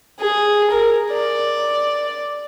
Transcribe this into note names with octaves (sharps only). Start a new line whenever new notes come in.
G#4
A#4
D5